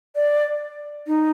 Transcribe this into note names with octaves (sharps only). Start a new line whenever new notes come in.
D5
D#4